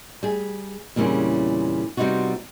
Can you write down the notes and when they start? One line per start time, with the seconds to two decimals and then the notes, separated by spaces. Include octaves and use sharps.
0.23 G3 G#4
0.96 E2 A#2 C#3 G3 C4 C#4
1.97 C3 G3 B3 D#4 F4 F#4